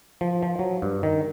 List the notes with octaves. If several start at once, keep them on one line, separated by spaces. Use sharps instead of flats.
F3
F3
F#3
G2
D#3